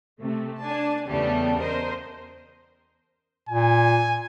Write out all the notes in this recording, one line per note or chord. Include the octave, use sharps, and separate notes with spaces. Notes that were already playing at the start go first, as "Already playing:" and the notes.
C3 A3
D4 G#5 A5
E2 C#3 G3 A3 B3
A#4 C5 D#5
A#2 G#5